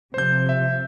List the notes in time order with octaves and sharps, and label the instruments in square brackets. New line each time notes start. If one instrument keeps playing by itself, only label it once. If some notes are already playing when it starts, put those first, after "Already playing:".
[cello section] C3 F3 [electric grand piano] C5 G6
[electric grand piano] E5